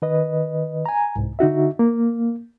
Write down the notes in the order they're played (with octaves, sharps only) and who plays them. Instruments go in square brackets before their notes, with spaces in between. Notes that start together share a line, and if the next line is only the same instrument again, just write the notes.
[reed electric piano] D#3 B4 D#5
G#5 A#5
C2 G#2
D3 D#4 F#4 E5
A#3